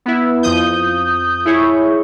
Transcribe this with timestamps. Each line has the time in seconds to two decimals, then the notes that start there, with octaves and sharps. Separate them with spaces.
0.06 B3 E4
0.43 F2 F3 D#6 G6
1.45 E4 G#4 C#5